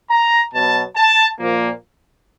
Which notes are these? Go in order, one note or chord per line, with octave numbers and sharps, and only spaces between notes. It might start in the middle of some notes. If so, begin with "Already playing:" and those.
A#5
B2 F#3 B3 A5
A5
A#2 F3 A#3